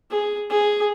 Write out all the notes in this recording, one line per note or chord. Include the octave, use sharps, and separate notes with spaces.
G#4
G#4